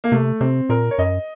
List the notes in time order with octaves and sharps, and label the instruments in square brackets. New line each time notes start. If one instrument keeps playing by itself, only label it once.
[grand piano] A#3
[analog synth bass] C3 [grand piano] A3
[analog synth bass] C3 [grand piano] C4
[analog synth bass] A#2 [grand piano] A#4
[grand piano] C#5
[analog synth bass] F#2 [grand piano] D#5